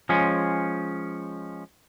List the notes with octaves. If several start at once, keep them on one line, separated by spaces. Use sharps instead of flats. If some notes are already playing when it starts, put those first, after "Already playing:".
F3 G#3 C#4